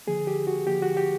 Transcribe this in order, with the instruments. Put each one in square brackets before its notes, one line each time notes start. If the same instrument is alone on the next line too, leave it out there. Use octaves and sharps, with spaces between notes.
[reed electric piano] D3 F3 A#3 G#4
G4
F#4
D3 F3 A#3 G4
F#4
G4